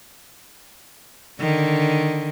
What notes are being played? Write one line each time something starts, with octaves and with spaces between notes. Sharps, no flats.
D3 D#3